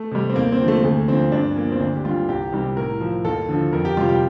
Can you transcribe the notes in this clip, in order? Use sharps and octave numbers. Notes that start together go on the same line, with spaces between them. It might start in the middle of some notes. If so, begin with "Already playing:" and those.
Already playing: A3
C3 G3
C4
D#2 A#3
C4
D3 F3
A3
D2 A3
D3 F3 C4
G2 D4
F3 A#3
C4
D2 D4
G4
D3 G3 F4
C2 G4
C3 D#3 G3
A2 A#4
F3
D#2 A4
D3 F3
F2 A#4
G4
C3 G3 F4
G4